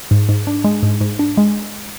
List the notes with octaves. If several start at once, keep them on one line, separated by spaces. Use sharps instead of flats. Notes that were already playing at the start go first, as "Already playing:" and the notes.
G#2
G#2
D4
G#3
G#2
G#2
D4
G#3